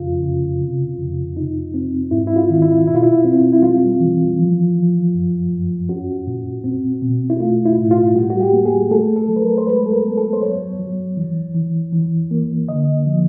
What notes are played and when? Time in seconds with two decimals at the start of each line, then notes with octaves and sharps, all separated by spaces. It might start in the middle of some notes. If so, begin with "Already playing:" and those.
Already playing: F2 C#3 F4
0.22 C#3
0.61 C3
0.98 F2
1.37 D#4
1.74 C4
2.11 G#2 E4
2.27 E4
2.36 F4
2.50 D#3
2.62 E4
2.87 B2 E4
2.95 F4
3.03 E4
3.25 C4
3.52 E4
3.62 G3 F4
4.00 E3
4.39 F3
4.76 F3
5.14 F#2
5.52 F#2
5.89 C#4 F#4
6.27 A#2
6.64 C4
7.02 B2
7.30 E4
7.40 A3 F4
7.66 E4
7.78 A2
7.91 F4
8.15 G3 F#4
8.30 F#4
8.40 G4
8.53 A#3
8.65 G#4
8.91 A3 A4
9.16 A4
9.29 F#3
9.36 B4
9.42 A#4
9.58 C5
9.66 G#3 B4
9.86 A4
9.92 A#4
10.04 B3
10.17 A4
10.33 C5
10.41 F#3 C#5
10.79 F#3
11.17 E3
11.55 E3
11.93 E3
12.31 A#3
12.68 D3 D#5
13.06 F3